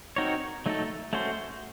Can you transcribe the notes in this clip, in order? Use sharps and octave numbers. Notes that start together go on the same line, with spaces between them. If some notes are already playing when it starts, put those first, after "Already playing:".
C4 D#4 F#4 A#4 C#5
F#3 A3 D#4 A4
A3 C#4 F#4 C5